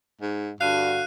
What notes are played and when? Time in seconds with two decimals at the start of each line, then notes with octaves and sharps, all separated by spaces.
0.21 G#2
0.61 G2 D3 F#4 F5 F#6 D#7